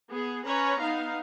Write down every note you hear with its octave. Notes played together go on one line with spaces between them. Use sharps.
B3 G#4
C#4 B4 C#5 A#5
B3 D#4 F5